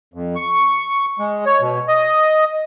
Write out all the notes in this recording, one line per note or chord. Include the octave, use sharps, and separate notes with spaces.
F2
C#6
G#3
C#5
B2
D#5